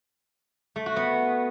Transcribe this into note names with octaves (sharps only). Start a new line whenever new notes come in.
A3
F#4
B3